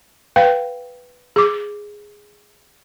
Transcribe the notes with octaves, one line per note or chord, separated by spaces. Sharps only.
B4 F5 G5
G#4 D6